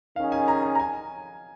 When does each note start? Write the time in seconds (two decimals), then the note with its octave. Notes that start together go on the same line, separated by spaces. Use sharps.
0.16 D#3 C#4 G#4 F5
0.32 G#5
0.48 A#5
0.63 G#5
0.75 A#5
0.79 G#5